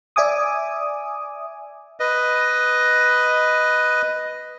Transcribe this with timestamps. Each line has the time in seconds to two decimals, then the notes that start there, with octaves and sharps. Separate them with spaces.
0.16 D5 E5 G#5 D6 D#6
2.00 B4 D#5